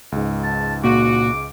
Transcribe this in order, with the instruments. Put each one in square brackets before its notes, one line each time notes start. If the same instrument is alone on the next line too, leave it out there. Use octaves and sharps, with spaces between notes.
[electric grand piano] C#2 G#2
[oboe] A5
[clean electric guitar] A#2 [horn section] F#4 [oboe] D6